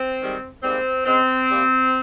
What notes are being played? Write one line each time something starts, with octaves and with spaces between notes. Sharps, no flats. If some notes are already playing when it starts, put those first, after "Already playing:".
Already playing: C4
G#2 D#3 G3
G#2 G3 A#3 C4
C#3 G#3 C4
C3 G3 A#3